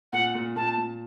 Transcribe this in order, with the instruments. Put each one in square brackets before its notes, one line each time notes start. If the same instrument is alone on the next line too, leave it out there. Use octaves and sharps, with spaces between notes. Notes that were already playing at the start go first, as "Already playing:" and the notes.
[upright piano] A#2 [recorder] F#5
[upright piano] A#2
[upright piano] A#2 [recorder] A5
[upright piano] A#2